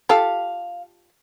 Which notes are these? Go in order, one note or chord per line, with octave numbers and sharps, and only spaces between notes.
F4 G4 A4 F5